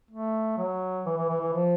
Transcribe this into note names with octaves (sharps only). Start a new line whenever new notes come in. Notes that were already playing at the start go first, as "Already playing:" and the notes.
A3
F#3
E3
E3
E3
E3
F3